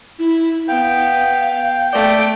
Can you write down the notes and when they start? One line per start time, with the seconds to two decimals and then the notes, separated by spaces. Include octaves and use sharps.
0.19 E4
0.68 B3 F5 G5
1.93 A3 D5 G5